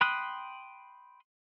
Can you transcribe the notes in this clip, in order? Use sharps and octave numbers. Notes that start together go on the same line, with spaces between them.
G5 B5 C6 D#6 F#6